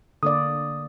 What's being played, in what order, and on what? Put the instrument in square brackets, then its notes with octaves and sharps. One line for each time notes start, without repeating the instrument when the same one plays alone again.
[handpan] D3 A#3 D5 [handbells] D#6